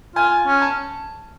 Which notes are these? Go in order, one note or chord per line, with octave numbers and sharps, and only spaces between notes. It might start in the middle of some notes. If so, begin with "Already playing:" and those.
F4 G#5
C#4
A5